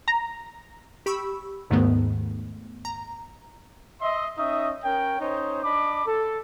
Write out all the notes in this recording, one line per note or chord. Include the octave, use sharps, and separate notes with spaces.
A#5
G4 B5 C#6 E6
D#2 G#2 D#3 A3 B3
A#5
D#5 E5 C6
C#4 D#4 D#5 E5 C#6 D#6
C#4 A#4 C#5 G5
C#4 D#4 C5 C#5 D#5
D4 D#5 B5 D6
A4